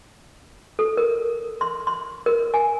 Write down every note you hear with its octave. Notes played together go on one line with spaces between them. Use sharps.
A4
A#4
C6
C6
A#4
G#5